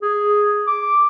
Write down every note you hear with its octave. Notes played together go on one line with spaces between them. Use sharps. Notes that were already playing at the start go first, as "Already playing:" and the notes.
G#4
D6